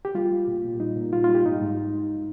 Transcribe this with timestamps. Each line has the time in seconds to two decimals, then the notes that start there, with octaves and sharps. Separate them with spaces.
0.05 G4
0.15 G3 F4
0.31 G3
0.48 A#2
0.64 A#2
0.80 G3 D#4
0.96 A#2
1.13 G3 F4
1.24 G3 F4
1.35 G4
1.45 G#2 D#4
1.62 G#2